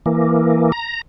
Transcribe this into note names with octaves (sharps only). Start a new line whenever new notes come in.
E3 A#3
A#5